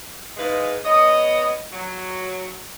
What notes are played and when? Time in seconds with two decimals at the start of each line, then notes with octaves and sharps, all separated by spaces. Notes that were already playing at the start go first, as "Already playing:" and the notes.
0.37 G#2 E3 G#3 B4 F5
0.85 B3 C#5 D#5
1.73 F#3